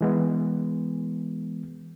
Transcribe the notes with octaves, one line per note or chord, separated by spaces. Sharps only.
E3 G#3 B3